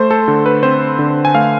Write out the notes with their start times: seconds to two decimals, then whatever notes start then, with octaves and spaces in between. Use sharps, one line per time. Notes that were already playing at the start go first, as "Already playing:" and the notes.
Already playing: A3 C5
0.11 A4
0.28 D3
0.46 B4
0.63 C4 C5
0.99 D3
1.25 G#5
1.35 A3 F5